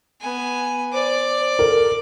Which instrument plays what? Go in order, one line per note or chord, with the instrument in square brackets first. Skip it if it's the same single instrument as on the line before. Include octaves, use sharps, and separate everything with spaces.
[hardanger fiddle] B3 G#5
[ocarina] C5 [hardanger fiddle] D5 D6
[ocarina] A4 [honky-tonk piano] A#4